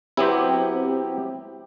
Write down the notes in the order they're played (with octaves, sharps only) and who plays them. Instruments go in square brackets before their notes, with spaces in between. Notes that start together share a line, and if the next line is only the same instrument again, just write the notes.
[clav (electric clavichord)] F#3 B3 E4 [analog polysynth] C4 G4